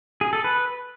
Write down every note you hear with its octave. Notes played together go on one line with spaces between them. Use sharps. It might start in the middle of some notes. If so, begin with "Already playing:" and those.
G#4
A4
B4